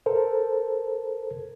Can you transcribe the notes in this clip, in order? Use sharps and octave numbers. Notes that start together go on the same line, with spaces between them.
A4 A#4 C5